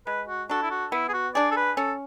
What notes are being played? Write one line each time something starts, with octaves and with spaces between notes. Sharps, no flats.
G#3 B4
F#4
D4 F#4 A4
E4
F#4
B3 E4
G#4
F#4
D4 G#4 D5
A4
B4
C#4 A4